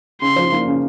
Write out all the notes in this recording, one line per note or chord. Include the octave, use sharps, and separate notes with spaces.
C#3 C6
F3
A#3
C#3